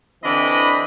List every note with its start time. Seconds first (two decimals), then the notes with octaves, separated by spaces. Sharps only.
0.24 D3 E3 C4 D4 D#5 B5